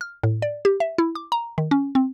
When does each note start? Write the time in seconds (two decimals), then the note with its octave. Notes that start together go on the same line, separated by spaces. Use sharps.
0.01 F6
0.23 A2
0.42 D5
0.65 G4
0.80 E5
0.98 E4
1.15 D6
1.32 A#5
1.58 D#3
1.71 C#4
1.95 C4